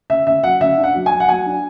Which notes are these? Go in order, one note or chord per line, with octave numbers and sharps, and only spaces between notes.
C#3 E5
C#3 E5
F#3 F#5
C#3 E5
D4
F#5
F#3
G#5
F#3
F#5
F#3 G#5
D4